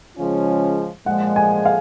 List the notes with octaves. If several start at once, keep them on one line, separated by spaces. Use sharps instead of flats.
C#3 F3 G#3 C#4 F4
A#2 F3 G#3 F#5
G#5
F5